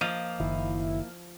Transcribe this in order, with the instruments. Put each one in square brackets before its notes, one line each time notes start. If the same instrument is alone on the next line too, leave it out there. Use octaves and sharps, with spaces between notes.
[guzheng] F3 [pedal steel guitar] A#3 D#5 F5
[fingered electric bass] F#1 D#3 [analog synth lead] E4